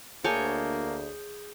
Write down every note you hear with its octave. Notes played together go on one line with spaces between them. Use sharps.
D2 A#3 G#4 C#5 G#5 A5 G6